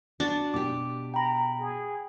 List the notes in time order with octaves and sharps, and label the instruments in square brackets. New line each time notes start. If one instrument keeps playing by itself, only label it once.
[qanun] D4 [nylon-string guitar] F#4 [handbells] D5
[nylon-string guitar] B2 G4 [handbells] D6
[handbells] G5 B5 [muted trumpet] A#5
[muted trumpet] G#4